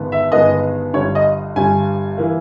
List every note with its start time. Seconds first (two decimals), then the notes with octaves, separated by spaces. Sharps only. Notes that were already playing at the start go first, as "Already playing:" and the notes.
Already playing: G1 G2 D#3 G#3 B3
0.12 E5
0.32 G1 G2 D#3 G#3 B3 D#5
0.93 G1 G2 G3 C#5
1.15 D#5
1.56 G1 G2 G3 G#5
2.18 E3 A#3